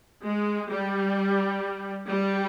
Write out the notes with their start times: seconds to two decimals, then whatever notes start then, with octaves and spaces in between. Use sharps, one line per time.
0.24 G#3
0.70 G3
2.08 G3